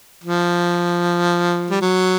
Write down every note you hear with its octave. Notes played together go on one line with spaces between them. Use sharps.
F3
G3
F#3